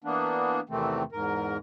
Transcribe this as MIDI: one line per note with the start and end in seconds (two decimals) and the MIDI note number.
0.04 0.60 52
0.04 0.60 58
0.04 0.60 59
0.04 0.60 62
0.69 1.03 40
0.69 1.03 48
0.69 1.03 51
0.69 1.03 52
0.69 1.03 57
0.69 1.03 60
1.12 1.57 40
1.12 1.57 44
1.12 1.57 70